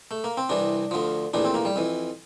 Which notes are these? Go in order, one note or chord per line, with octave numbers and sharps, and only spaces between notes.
A3
A#3
C4
C2 C3 E3 D4
D2 D3 F3
A#1 A2 E3 D4
C4
A#3
G3
F2 E3